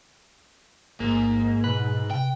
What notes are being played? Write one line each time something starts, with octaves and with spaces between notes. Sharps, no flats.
A1 G#2 A#3
B2 B4
C3 G5